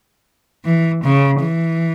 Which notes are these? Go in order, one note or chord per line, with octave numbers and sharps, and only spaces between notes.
E3
C#3
E3